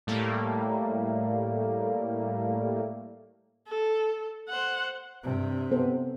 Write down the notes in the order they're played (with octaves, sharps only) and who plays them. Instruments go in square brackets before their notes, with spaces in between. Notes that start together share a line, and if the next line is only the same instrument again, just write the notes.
[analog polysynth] A2 G3 A3 A#3
[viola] A4
C5 F#5
[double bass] G2 C3
[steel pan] B3 A4 C5